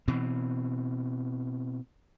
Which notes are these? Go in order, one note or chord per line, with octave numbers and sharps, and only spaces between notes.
B2 E3 C4